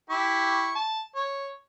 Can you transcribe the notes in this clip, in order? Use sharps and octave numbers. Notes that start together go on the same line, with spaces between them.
E4 G4 C#6
A5
C#5